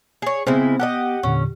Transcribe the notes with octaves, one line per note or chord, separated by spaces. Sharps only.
G#4 C#5
C#3 G#3 B3 C4 E4
G4 A4 D#5 F#5
E2 A#2 D3 C#4